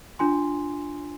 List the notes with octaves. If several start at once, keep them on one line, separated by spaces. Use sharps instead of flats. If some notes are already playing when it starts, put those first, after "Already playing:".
D4 F4 G#5 C6